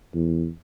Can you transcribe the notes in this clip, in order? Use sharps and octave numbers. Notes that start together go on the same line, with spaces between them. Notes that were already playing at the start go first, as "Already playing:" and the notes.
E2